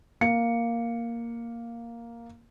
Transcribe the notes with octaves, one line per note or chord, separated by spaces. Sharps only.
A#3 C#7